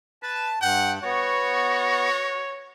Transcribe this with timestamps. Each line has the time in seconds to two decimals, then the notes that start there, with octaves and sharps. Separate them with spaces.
0.23 B4 A5
0.62 G2 F#5 G5
1.04 B3 F#4 C#5